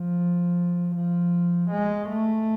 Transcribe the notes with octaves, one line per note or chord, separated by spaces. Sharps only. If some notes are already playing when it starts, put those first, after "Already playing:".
Already playing: F3
F3
G#3
A3